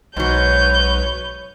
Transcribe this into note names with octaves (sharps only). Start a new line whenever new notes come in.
B1 G#2 F#3 B4 C#5 G6